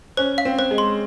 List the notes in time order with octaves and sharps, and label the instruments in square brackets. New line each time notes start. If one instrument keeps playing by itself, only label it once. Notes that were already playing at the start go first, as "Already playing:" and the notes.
[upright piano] C#4 [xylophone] C5
[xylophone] F5
[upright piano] C4
[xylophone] C5
[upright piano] G#3
[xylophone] C6